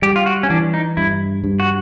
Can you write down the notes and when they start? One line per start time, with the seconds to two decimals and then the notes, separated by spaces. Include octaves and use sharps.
0.02 G3 G4
0.16 F4
0.26 F#4
0.43 C#4
0.50 E3 D4
0.74 D#4
0.97 G2 E4
1.44 G2
1.60 F#4